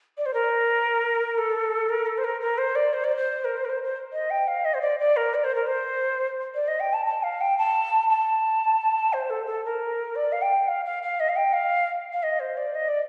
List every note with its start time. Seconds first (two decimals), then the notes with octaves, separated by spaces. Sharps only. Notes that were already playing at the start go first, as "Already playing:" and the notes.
0.17 D5
0.26 C5
0.34 A#4
1.38 A4
1.89 A#4
2.06 A4
2.18 C5
2.24 A#4
2.41 A#4
2.58 C5
2.75 D5
2.93 C5
3.04 D5
3.16 C5
3.44 A#4
3.57 C5
3.65 A#4
3.69 C5
3.83 C5
4.13 D#5
4.30 G5
4.48 F5
4.65 D#5
4.74 C5
4.81 D5
4.99 D5
5.16 A#4
5.34 D5
5.44 C5
5.55 A#4
5.66 C5
6.55 D5
6.68 D#5
6.80 G5
6.93 A5
7.06 A5
7.23 F5
7.41 G5
7.58 A5
8.09 A5
9.13 C5
9.30 A4
9.46 A4
9.65 A#4
10.15 D5
10.32 F5
10.42 G5
10.68 F5
10.85 F5
11.03 F5
11.20 D#5
11.29 F5
11.36 G5
11.53 F5
12.12 F5
12.23 D#5
12.40 C5
12.57 D5
12.75 D#5
12.88 D5